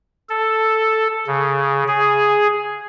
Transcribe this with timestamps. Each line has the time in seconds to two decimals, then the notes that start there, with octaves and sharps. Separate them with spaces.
0.29 A4
1.27 C#3
1.88 G#4